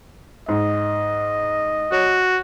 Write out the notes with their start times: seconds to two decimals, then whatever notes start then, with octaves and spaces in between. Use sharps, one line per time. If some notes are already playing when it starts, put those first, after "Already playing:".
0.49 G#2 D#5
1.92 F#4 C#5